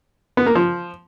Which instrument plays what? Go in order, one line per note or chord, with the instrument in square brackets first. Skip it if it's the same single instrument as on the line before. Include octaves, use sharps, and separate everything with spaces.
[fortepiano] B3
A#3
F3